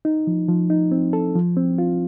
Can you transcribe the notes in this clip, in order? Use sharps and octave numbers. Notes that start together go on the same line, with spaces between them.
D#4
F3
F3
D#4
C4
A4
F3
C4
F4